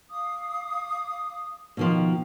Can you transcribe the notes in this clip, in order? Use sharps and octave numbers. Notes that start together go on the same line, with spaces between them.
F5 D6 D#6
B2 D#3 F3